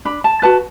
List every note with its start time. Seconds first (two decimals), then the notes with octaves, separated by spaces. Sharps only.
0.05 D4 B5
0.24 A5
0.42 F#4 B4 A5